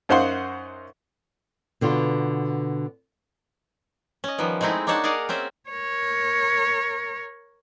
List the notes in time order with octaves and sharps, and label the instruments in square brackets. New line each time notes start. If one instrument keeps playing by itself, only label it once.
[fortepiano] F#2 D#4 C5 F5 F#5 C6
[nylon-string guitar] B2 D3 B3 F4
[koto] C#4 D#5
D#3 F3 G3 B3
G#3 A3 C4 D#4 E4 G#4
A#3 D4 D#4 C#5 F#5 A5
G#4 A#4 D5 D#5 F5 F#5
C4 C#4 C5 E5
[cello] A#4 C#5